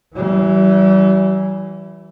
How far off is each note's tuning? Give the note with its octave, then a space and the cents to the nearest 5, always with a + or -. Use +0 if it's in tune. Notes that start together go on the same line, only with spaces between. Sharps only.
E3 +0 G3 -45